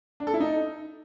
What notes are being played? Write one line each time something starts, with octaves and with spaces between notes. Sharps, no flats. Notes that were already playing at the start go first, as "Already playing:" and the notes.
D4
A4
E4
D#4